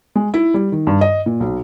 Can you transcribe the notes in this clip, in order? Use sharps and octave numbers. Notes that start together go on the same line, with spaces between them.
G#3
E4
G3
D#3
G2
D#5
A#2
B1